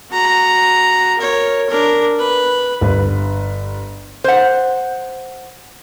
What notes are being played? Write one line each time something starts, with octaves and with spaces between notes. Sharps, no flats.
F#4 A#5
A#4 C#5
D4 A#4
B4
G1 B4
C5 F#5